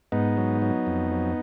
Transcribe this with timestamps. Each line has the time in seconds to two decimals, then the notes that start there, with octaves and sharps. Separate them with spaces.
0.12 G#2 B3 D#4
0.37 F#3
0.62 F#3
0.87 F2
1.11 F#3